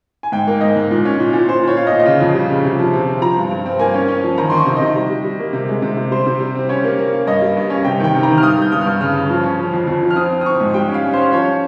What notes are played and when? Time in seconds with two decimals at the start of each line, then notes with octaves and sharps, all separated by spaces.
0.23 G#5
0.32 G#2 G5
0.47 A#3
0.61 G#2 D#5
0.76 G#2
0.91 A#2
1.05 C#4
1.20 A#2
1.33 A#2
1.48 A#2 C5
1.63 A#2 C#5
1.77 A#2 F5
1.87 D#5
1.92 A#2
2.00 D#5
2.06 C#3 F5
2.21 F2
2.34 G3
2.50 C#3
2.65 C3
2.79 F3
2.93 C3
3.07 C4
3.21 F3 A#5
3.37 G2
3.51 G2
3.66 C4
3.79 A#3 G#5
3.94 C#4
4.08 C#4
4.23 F3
4.38 D#3 A#5
4.50 D#3 C6
4.57 C#6
4.66 C3
4.76 C3 D#5
4.95 G3
5.10 G3
5.24 G3
5.39 A#3
5.53 C3
5.69 G#3
5.82 C3
5.97 C3
6.11 G3 C5
6.26 C3
6.40 G3
6.55 C4
6.69 C#4 C#5
6.84 A#3
6.99 A#3
7.13 A#3
7.27 G2 D#5
7.42 G3
7.57 G2
7.70 C#4
7.85 C3 G5
8.00 D#3 G5
8.15 C3
8.23 A#5
8.28 D#3
8.38 F6
8.43 G2 D#6
8.58 G2 G6
8.72 G2 D#6
8.81 F6
8.86 G2
9.00 C#3 F6
9.16 C#3
9.30 F3
9.44 C#4
9.59 F3
9.73 F2
9.87 F2
10.02 F3
10.11 F6
10.16 C4 D#6
10.31 C4
10.41 D#6
10.46 C4 C#6
10.60 G#2
10.74 G3 G5
10.88 C#4
10.94 F5
11.04 C#4
11.14 C5
11.17 C#4
11.33 F3 C#5